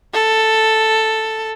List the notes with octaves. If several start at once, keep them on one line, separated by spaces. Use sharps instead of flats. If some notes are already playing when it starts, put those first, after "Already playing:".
A4